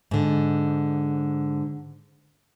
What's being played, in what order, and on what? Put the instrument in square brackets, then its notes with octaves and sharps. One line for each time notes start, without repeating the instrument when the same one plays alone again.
[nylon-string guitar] G#2 D3